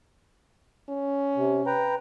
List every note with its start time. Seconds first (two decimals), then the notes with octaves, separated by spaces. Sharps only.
0.89 C#4
1.36 C3
1.67 B4 G5 A#5